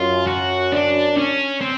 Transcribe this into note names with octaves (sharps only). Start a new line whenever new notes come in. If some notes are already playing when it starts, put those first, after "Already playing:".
Already playing: F#2 F4
F#4
D4
C#4
C4